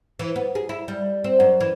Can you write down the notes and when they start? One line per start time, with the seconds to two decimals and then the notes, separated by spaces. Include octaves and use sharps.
0.19 E3
0.36 B3
0.55 G#4
0.69 E4
0.88 G3
1.24 C4
1.40 F#2
1.60 E3